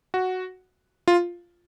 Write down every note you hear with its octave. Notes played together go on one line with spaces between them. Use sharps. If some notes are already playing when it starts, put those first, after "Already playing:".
F#4
F4